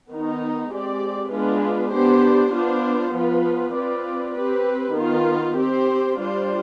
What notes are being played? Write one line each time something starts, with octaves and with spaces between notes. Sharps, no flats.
D#3 B3 D#4
G#3 C4 G4 D5
G#3 B3 D4 F4 B4
B3 D4 G4 C5
B3 D4 F4 C5
F3 B3 F4 B4
C4 F4 B4 D5
C4 G4 B4
D#3 B3 F4
C4 G4 C5
G3 D4 F4 C5